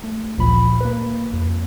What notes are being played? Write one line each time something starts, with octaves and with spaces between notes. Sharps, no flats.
A3
A1 D2 A#2 F3 B5
A#3 B4
F2